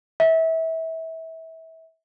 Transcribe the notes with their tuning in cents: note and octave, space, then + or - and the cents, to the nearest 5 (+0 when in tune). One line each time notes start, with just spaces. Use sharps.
E5 -25